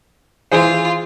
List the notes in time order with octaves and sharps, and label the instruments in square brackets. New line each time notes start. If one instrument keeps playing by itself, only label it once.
[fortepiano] E3 G#4 C5 [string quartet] F4